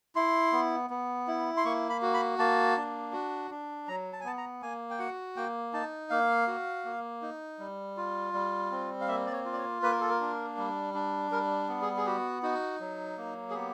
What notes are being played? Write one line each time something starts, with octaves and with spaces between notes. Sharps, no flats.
E4 C6
B3
B3
E4
C6
A#3 C#6
B5
F#4
B5
A#3 A5
D4
F#4
D4
F#3 A#5
A5
G#5
B3 A5
A#5
A#3 G#5
G5
F#4 F#5
A#3 G5
D#4 A5
A#3 F5
F#4
A#3
D#4
G3
F4
G3
C4
F5
A#3 E5
D5
C#5
F4
D5
C#5
A#3 B4
A#4
A4
A#4
D4
G3
D4
G3 A#4
B3
G#4
G#4
F#4 G4
D#4 F#4
F#3
A#3
G#4
B3 G4